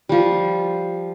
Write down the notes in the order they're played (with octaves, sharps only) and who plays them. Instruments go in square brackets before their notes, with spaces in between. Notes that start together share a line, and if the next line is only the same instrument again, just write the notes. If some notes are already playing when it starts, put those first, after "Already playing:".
[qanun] F3 G3